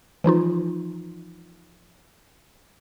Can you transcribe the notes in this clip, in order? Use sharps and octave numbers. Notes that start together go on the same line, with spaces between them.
E3 F3 D#4 F4